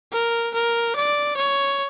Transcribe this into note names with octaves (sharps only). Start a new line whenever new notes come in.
A#4
A#4
D5
C#5